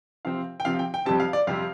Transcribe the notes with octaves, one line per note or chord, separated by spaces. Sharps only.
C3 F3 C4 F5
G5
C3 F3 C4 F5
G5
G5
F2 C3 G3 C4 A5
F5
D5
F2 C3 G3 C4 F5